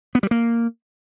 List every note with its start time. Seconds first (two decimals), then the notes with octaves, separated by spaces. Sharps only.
0.15 B3
0.23 G3
0.31 A#3